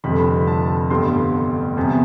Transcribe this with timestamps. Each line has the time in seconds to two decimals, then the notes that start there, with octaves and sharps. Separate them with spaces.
0.04 F1 F2 D3 G3 B5
0.47 A5
0.90 A1 G2 D3 G3 B3 C6
1.77 E2 C3 G3 B3